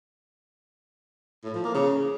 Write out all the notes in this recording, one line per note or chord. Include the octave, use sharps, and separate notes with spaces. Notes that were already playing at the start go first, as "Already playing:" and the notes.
A2
F3
A#3
C#3